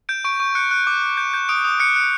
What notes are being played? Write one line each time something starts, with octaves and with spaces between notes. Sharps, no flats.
G6 D7
C#6 D7
C#6
F#6 C#7
F#6
D6
D6
G6
G6
D#6 D7
D#6
F#6 C#7
F#6